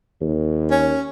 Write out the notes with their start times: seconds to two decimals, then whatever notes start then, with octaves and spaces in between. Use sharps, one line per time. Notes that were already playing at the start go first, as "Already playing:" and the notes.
0.21 D#2
0.71 C#4